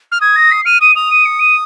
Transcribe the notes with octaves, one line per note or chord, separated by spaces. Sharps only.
F6
D#6 G#6
A#6
C7
F6 D#7
D#6 D#7
D#6 F7
D#7
C#7
D#7